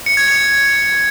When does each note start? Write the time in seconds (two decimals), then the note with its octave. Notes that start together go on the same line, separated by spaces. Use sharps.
0.06 C#7
0.17 G#6
0.28 C#7